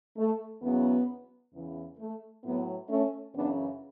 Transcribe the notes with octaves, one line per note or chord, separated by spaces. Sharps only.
A3
E2 C#3 F#3 B3
E2 C#3 E3
A3
A2 F#3 B3
A3 C#4
F#2 C#3 E3 B3 D4